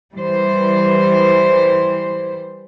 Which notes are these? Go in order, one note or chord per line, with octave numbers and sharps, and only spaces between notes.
E3 G3 C5